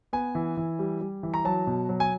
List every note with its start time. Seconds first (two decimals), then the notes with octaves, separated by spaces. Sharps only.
0.13 B3 G#5
0.35 E3
0.57 E3
0.79 G3
1.01 G3
1.23 E3
1.34 A#5
1.45 F#3 A5
1.67 B2
1.89 F#3
2.00 G#5